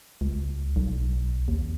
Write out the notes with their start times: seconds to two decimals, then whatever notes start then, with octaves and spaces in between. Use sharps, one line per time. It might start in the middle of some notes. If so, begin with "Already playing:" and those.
0.21 C#2
0.76 B1
1.48 D#2